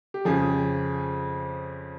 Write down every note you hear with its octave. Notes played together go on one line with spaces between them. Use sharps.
G4
F2 C#3 F3 G#4